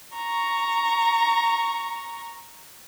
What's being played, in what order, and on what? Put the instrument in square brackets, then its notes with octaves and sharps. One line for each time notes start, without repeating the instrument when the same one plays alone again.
[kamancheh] A#5 C#6